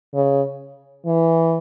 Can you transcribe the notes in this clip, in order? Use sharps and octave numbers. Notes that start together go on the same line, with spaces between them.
C#3
E3